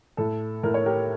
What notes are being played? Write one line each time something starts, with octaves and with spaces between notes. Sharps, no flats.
A2 A4
A2 A#4
C#5
G4 A#4